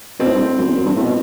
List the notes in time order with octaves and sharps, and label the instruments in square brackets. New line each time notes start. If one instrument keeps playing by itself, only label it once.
[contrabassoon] B2 [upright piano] C4
[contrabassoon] A2
G2
A2
F#2
E2
F#2
G2
A2
B2